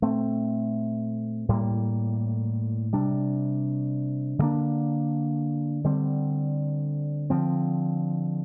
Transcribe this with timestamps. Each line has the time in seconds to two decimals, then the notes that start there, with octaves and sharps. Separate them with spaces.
0.02 A#2 A3 C4
1.49 A2 G3 A#3
2.93 C3 G3 D4
4.39 D3 G3 A#3 D4
5.84 D3 G3 C4
7.30 D3 F3 C4